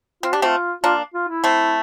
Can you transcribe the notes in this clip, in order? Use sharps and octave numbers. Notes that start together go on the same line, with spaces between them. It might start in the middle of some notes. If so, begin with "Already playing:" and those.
C4 F4
D4 G4
A3 C4 F4
A#3 D4 F4
F4
E4
A3 C4